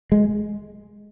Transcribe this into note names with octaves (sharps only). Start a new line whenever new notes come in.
G#3